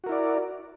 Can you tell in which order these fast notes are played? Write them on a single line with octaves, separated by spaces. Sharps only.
F#4 A#4 E4 D5